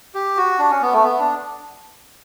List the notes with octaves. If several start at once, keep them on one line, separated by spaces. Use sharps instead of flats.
G4
F#4
D4
C#4
B3
A3
B3
D4